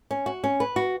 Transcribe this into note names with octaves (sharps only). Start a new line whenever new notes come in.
C#4
F#4
C#4
B4
F#4